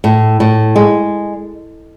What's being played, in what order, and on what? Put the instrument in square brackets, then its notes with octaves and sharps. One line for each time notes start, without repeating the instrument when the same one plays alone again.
[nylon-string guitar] A2
A2
G#3